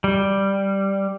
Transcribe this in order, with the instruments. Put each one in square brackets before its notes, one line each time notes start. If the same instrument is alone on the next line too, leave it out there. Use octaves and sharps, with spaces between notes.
[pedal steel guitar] G3